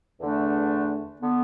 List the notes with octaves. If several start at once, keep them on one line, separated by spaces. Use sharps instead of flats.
E2 D3 A3 D4
D3 B3